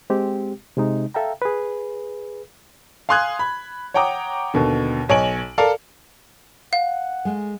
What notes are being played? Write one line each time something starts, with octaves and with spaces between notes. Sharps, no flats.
G#3 C4 G4
C3 G#3 D#4
A4 E5 F5 G5 A#5
G#4 B4
F5 G#5 C6 D#6 F#6 G#6
B5
C#5 F#5 G5 A#5 D6 D#6
D#2 B2 D3
B1 C#5 D#5 G#5 D7 F#7
A4 A#4 D5 F5
F5 F#5
G#3 A3